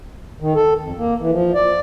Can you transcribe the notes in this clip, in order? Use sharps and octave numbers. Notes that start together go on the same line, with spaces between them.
D#3
A4
F2
A#3
E3
F3
D5